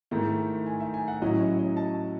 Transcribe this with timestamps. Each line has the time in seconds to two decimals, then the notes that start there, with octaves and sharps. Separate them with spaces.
0.11 G#2 D#3 A3 E4
0.66 G#5
0.80 E5
0.94 G#5
1.08 F#5
1.22 A2 F#3 C#4 E4 D#5
1.40 C#5
1.59 D#5
1.77 A5